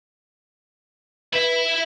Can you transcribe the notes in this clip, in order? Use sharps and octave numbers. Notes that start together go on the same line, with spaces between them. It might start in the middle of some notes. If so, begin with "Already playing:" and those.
E4 B4 E5